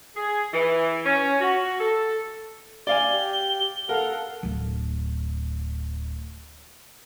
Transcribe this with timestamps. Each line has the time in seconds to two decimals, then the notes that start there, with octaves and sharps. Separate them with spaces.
0.15 G#4
0.52 E3
1.05 C#4
1.40 F#4
1.79 A4
2.87 D5 F5 G#5 G7
3.13 G4
3.89 A4 A#4 F5 F#5
4.43 D1 D3